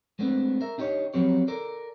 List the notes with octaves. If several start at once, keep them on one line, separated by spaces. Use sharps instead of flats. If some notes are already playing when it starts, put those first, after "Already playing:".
G#3 A3 B3 C4 D4
A#4 E5
D4 D#4 G4 B4 C#5
F3 F#3 B3 C4 G4 C#5
A4 A#4 D5